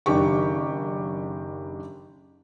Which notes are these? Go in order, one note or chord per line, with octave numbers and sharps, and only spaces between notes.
F#1 D#3 D4 G4 C#6